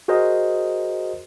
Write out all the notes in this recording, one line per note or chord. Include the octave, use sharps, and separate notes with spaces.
F#4 G#4 A#4 C5 D#5